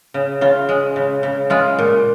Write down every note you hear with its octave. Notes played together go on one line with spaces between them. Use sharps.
C#3
C#3 F4
G#3
C#3
C#3
G#3 F4
A#2